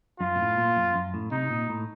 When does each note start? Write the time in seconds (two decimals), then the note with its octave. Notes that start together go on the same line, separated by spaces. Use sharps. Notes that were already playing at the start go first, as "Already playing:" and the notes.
0.20 F#2 F4
0.35 A#2
0.39 A2
0.58 A#2
0.76 F#2
0.95 F#2
1.14 A2
1.31 C3 D#4
1.50 A#2
1.69 A2